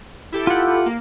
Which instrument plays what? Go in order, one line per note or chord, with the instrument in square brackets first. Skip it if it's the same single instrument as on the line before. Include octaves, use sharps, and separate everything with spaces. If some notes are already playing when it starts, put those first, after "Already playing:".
[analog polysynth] E4 G4 A4
[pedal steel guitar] F4 F#5
[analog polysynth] A#3